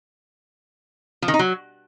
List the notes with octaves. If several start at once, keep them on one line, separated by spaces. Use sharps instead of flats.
F3
D#3
D#4
F#3